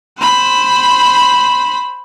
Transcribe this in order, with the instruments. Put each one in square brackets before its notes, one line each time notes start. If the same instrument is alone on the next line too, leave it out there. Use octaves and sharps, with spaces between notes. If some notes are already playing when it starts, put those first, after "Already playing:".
[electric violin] C5 B5